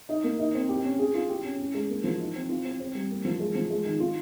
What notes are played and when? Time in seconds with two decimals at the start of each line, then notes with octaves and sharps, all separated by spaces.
0.09 D#4
0.24 A#3
0.39 D#4
0.54 C4
0.69 G4
0.84 C#4
0.99 G#4
1.15 F4
1.29 G4
1.44 C#4
1.59 C#4
1.74 G#3
1.90 A#3
2.04 F3
2.20 D#4
2.35 C4
2.49 F4
2.65 C4
2.80 C4
2.95 G3
3.11 A#3
3.25 F3
3.40 G#3
3.55 F3
3.70 G#3
3.85 D#3
4.00 F4